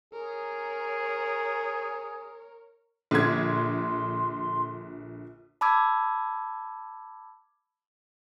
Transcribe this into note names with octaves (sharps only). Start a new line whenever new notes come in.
G#4 A#4 C#5
A#1 D3 C6 G#6
A5 B5 D6 E6 G#6